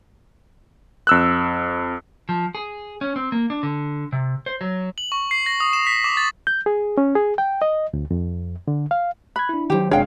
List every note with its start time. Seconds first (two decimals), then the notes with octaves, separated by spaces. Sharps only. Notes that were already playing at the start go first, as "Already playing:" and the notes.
1.07 F2 E6 F#6
2.29 F3
2.55 G#4
3.01 C#4
3.16 C4
3.32 A#3
3.50 D4
3.63 D3
4.12 C3
4.46 C5
4.61 F#3
4.98 F#7
5.12 C#6
5.31 C7
5.46 A#6
5.60 D#6
5.73 E7
5.87 B6
6.04 D6
6.17 A6
6.47 G6
6.66 G#4
6.98 C#4
7.15 G#4
7.38 G5
7.62 D#5
7.94 D2
8.11 F2
8.68 D3
8.91 F5
9.36 B5 F#6 G#6
9.49 D4 E4
9.70 D#3 F#3 G4 C5
9.91 F#1 C3 G#3 D4 C#5 F5 G5